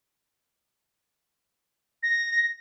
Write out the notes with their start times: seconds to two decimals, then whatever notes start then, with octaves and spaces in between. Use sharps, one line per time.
2.03 A#6